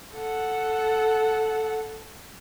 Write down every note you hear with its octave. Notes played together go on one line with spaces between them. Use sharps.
A4 F#5